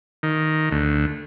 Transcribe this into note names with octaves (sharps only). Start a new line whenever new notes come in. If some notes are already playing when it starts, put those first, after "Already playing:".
D#3
D2